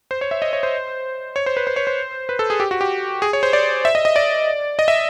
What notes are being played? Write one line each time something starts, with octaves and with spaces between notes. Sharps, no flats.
C5
C#5
E5
D#5
C#5
C5
C#5
C5
B4
C5
C#5
C5
B4
A4
G#4
G4
F#4
G4
G#4
C#5
C5
D5
E5
D#5
D#5
D5
D#5
E5